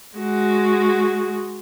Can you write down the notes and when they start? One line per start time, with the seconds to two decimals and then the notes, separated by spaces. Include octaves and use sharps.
0.18 G#3 F#4